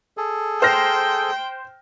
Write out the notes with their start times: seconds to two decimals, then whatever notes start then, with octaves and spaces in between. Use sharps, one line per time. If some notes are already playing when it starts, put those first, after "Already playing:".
0.17 G#4 A4
0.62 C5 G5 F6 A#6